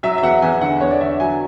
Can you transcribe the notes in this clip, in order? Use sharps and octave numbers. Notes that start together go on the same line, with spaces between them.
F#3 E5
E5
E2 F#5
E2 G#5
D3 F#5
E2 C#5
D5
D3 E5
F#3 G#5